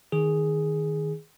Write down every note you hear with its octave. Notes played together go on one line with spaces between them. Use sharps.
D#3 G#4